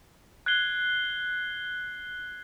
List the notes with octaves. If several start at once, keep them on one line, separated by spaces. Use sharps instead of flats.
F#6 G#6 C7 G7